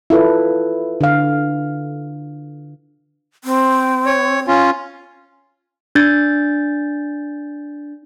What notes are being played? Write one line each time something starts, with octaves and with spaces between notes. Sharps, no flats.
E4 F4 A4 B4
D3 F5
C4
C#5
C#4 F4
D4 G6 A6